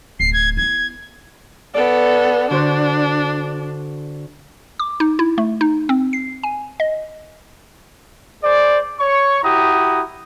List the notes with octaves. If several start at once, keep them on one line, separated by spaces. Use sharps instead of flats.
D1 C7
G#6
B3 E4 G#6
B3 A4 D5
D3 D4 F#4 C5
D6
D#4
E4
A3
D#4
C4
C7
G#5
D#5
G#4 C5 D5
C#5 C#6
E4 F#4 G4 A#5 D#6